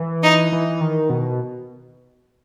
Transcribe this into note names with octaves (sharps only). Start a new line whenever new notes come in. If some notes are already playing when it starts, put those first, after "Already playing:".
Already playing: E3
D#4
E3
D#3
B2